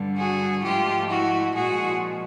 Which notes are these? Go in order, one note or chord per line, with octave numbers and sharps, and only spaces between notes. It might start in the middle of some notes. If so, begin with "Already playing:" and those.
Already playing: G2 D3 G3
F#4 G#4
G#2 F3 A3 F4 G4
E4 F#4
A#2 F3 G#3 F#4 G#4